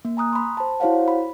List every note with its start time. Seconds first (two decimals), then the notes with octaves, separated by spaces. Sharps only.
0.05 A#3
0.17 G#5 A#5 D#6 F#6
0.33 B5 C6
0.57 C5 A5
0.80 E4 F#4 C5 C#5 F5 F#5
1.08 B5